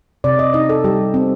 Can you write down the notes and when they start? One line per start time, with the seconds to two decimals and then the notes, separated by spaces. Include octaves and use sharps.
0.24 C3 D5
0.39 D#5
0.54 D#4 D#5
0.69 A4
0.84 G3 G4
1.14 C4